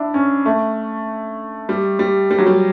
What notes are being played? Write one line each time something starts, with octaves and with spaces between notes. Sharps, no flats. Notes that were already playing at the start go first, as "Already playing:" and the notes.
Already playing: D4 E4
C#4
A3
G3
G3
G3
F#3
G3